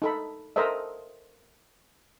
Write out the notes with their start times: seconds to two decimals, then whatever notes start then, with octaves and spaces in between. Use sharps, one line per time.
0.02 D#4 A4 B5
0.56 A4 A#4 C5 D#5 E5